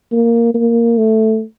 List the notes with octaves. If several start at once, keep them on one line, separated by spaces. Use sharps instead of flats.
A#3
A#3
A3